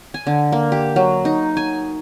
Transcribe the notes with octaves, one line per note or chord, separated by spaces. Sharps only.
G#5
D3
A#3
G4
F#3
D#4
G#5